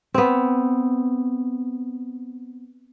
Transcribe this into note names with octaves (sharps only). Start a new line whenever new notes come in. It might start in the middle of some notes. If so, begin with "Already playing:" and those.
B3 C4